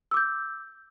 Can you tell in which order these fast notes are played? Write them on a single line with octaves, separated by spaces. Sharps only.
E6 D6 G6